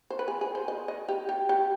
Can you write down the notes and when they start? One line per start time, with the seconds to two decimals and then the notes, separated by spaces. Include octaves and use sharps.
0.10 C5
0.19 B4
0.28 G#4
0.41 G#4
0.55 C5
0.68 D#5
0.88 D#5
1.09 G4
1.29 G4
1.49 G4